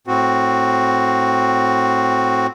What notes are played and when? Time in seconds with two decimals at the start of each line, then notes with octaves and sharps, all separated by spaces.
0.07 A2 C4 F#4